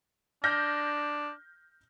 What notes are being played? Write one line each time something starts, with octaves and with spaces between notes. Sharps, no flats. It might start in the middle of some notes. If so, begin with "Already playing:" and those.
D4 F6 G6 A#6